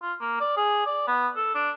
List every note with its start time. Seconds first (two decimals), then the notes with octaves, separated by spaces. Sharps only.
0.02 F4
0.20 A#3
0.40 D5
0.57 G#4
0.86 D5
1.07 B3
1.36 A4
1.55 D4